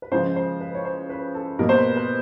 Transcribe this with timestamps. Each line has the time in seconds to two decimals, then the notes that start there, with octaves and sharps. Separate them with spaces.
0.02 B4
0.12 C#3 F3 G#3 C5
0.36 C5
0.61 B4
0.75 C#5
0.85 C5
1.09 B4
1.34 A4
1.59 B2 G3 A#3 A#4
1.69 C5
1.77 B4
1.96 B4